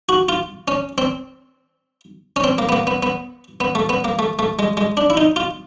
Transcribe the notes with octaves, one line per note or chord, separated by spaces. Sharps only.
F#4
F4
C#4
C4
C#4
C4
A#3
B3
A#3
B3
B3
B3
A3
B3
A#3
A3
A3
G#3
G#3
D4
E4
D#4
F4